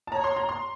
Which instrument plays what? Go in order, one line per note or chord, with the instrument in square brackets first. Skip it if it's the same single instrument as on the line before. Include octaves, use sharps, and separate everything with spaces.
[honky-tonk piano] A5
[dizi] C#5 [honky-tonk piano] A#5
[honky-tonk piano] C6
A#5
C6